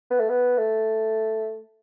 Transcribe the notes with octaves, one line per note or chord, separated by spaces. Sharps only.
B3
A3
B3
A3